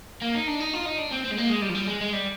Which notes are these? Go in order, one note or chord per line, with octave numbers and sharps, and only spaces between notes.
A#3
D#4
D4
D#4
F4
D#4
D4
C4
C4
G#3
A#3
G#3
G3
F3
G3
G#3
G#3
G3